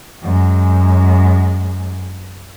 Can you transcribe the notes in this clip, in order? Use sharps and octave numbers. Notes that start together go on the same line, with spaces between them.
F#2 G#3